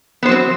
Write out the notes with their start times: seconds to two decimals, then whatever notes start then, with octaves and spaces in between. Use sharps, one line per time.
0.23 B3
0.25 C5
0.28 F#3
0.31 C4